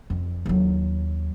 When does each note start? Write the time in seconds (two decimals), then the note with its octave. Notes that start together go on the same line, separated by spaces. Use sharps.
0.10 F2
0.46 D#2 F#3